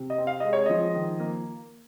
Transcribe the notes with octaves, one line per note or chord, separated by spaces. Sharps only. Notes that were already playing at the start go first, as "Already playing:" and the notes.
Already playing: C3
D#5
C4
F5
G#3 D#5
C#5
F3 D#5
D#3
A#3